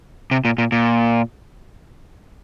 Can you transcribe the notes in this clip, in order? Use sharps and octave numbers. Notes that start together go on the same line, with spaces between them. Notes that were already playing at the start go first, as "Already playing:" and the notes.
C3
A#2
A#2
A#2